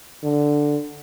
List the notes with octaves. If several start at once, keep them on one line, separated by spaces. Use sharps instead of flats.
D3